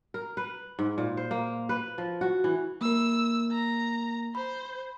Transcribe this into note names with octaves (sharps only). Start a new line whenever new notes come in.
A#4
B4
G#2
A#2
C5
A#3
B4
F3
F#4
E3
A#3 A#4 E6
A#5
C5 B5